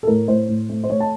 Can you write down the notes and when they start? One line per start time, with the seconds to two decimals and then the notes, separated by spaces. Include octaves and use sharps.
0.03 A4
0.07 A2 A#4
0.28 A2 C5
0.48 A2
0.69 A3
0.84 C5
0.89 A3 C#5
1.00 A5